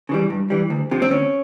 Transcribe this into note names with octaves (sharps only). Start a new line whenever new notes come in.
C#3 E3 G3
G2
E3 G3
D2
C3 F3
C4
D2 C#4